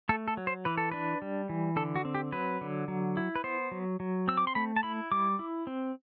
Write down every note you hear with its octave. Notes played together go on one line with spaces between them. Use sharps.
A3 A4
A4
F#3
C5
E3 B4
A4
D4 B4
G3
E3
D3 A4
F#4
C4
G4
F#3 B4
D3
F#3
E4
B4
B3 C5
F#3
F#3
C4 E6
D6
C6
A3 B5
A5
E4 B5
G3 D6
E4
C4